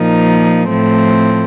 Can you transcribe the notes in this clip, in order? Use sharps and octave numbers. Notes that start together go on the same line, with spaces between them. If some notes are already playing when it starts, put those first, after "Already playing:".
Already playing: A#2 F3 A#3 D#4
A2 F3 A3 C4